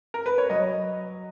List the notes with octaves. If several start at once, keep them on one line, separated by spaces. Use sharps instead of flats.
A#4
B4
C#5
F#3 D#5